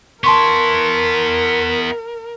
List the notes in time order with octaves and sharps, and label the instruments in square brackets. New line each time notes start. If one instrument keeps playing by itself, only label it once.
[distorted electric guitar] B3 E4 [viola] A#4 [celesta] A5 C6 C#6